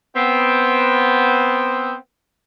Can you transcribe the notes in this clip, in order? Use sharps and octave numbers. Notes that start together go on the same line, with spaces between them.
B3 C4